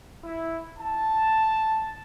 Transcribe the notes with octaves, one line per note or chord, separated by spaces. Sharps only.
E4
A5